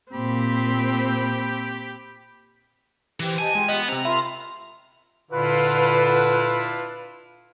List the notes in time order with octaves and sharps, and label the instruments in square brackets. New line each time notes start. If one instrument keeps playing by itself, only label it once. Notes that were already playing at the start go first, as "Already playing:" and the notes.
[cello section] A#2 [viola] C4 [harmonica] G4 B5
[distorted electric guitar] E3 [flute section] G4 C5
[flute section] G4 D#5 A5 [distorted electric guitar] G#5
[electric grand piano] G#3 [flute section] F4 G4 G5
[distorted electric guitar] B3 [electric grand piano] D#5
[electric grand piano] C3 C4 [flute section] G5 [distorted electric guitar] A#5
[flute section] F4 A#4 C6 [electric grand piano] E5 B5
[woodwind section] A#2 D3 B4 [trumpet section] D4 E4 F4